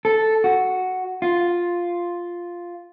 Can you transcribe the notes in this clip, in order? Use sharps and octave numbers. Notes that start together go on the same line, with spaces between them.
A4
F#4
F4